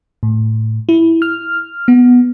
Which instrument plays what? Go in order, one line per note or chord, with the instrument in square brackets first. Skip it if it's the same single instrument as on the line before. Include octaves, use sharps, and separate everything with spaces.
[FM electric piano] A2
E4
F6
B3